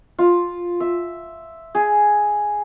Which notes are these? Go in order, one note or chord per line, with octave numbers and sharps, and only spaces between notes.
F4
E5
G#4